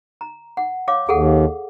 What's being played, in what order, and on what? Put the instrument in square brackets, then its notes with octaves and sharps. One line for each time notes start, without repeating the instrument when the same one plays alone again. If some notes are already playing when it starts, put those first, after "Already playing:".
[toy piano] A#5
F#5
C#5 F5 D6
[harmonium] D#2 [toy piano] G#4 A4 F#5